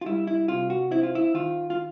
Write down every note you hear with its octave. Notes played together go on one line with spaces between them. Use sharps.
F4
G3 E4
E4
C3 F4
F#4
C4 E4
F4
E4
D#3 F4
F4